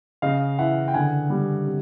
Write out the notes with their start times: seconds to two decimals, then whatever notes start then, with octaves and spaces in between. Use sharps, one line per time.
0.22 C#3 D#5 F5
0.58 E3 E5 F#5
0.88 G5
0.94 D3 F#5 G#5
1.30 G3
1.66 C3